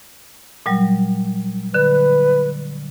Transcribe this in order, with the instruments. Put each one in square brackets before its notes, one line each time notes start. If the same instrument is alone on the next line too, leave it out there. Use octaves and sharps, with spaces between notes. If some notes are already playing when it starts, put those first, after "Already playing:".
[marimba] A#2 F#3 G3
[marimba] D3 F#6 [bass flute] B4